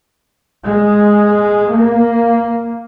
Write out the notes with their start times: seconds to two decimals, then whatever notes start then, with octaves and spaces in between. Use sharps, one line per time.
0.63 G#3
1.68 A#3